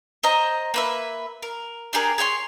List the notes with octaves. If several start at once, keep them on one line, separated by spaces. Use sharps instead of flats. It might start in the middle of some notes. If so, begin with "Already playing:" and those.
C5 D#5 A#5
A#3 B4 E5
A#4
D4 G4 G#4 A#4
G#4 C#5 G5 C6